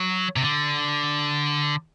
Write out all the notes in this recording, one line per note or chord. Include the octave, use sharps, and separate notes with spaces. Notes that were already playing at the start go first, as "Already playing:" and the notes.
Already playing: F#3
C3
D3